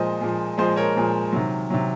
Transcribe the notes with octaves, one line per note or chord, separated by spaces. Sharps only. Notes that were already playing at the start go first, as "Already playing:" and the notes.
Already playing: A#2 F3 G#3 C5 D#5
A#2 F3 G#3
A#2 F3 G#3 C5 D#5
A#4 C#5
A#2 F3 G#3
C3 D#3 F#3
C3 D#3 F#3